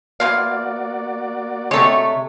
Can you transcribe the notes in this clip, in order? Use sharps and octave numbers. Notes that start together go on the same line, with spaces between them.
E3 F3 A#3 F#4 D5 F5
C3 G#3 A3 A4 C#5